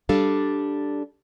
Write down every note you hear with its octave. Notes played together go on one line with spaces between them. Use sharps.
G3 D4 A4 F5